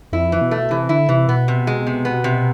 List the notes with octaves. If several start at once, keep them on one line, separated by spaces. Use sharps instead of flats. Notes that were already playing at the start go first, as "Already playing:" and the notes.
F2 E4
E3
B2
A3
C3 E3
D3 E4
C3 E3
B2 B3
C3
G#3
C3
B3
C3